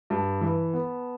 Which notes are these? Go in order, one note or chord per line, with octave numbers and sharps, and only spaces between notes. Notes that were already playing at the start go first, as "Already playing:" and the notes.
G2 A5
E3
B3